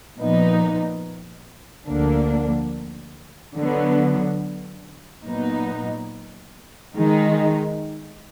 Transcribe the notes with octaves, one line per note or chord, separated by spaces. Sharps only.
A#2 F3 B3 D#4
D2 D3 F3 A#3 D4
D3 F#3 B3
A#2 F#3 B3 D#4
D#3 G#3 D#4